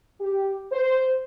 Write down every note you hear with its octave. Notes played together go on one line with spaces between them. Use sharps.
G4
C5